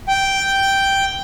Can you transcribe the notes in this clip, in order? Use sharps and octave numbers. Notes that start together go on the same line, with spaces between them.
G5